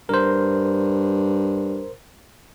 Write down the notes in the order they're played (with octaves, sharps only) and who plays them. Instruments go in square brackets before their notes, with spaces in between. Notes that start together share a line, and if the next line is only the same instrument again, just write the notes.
[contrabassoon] G2 [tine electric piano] A#4 C5